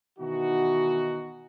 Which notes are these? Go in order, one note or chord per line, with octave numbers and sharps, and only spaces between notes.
B2 D#3 E3 D#4 F#4